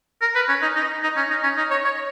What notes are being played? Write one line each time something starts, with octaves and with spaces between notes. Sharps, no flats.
A#4
B4
C#4
D#4
D#4
D#4
C#4
D#4
C#4
D#4
C#5
C#5